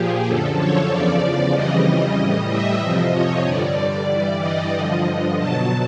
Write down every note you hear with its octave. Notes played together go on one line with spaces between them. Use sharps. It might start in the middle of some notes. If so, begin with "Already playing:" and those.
Already playing: A#2 F3 G4 G#4
F#2 D3 F3 A4
C#5
E2 C#3 F3 D5
F2 C#3 E3 G3 D#5
A2 E3 G3
E5
F2 C3 F3 D#5
C#5
G2 D3 G3 D5
D5
G2 E3 G3
D#5
G2 D3 F3
B2 F#3 A5